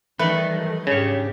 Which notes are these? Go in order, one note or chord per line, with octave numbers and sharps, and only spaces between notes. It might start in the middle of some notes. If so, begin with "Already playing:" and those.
D#3 E3 F#3 G3 A3 A#4 B4 D5
G#2 C#3 D4 G4 C#5